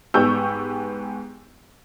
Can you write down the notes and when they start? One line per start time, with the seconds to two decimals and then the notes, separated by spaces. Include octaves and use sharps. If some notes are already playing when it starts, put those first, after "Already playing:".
0.14 G#2 B3 G4 C#6 E6 G6